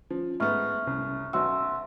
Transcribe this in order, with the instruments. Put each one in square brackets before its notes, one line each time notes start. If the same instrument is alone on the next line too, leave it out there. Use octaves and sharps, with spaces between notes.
[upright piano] F3 [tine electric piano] C#4
[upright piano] G#2 A3 B3 [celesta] E5 C#6 F6
[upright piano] C2 [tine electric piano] C3 C#4
[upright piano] B1 F#3 F#4 [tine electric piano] E5 [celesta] C6 E6